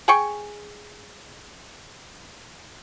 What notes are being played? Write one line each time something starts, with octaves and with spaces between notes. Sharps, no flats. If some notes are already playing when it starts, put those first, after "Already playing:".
G#4 G5 C#6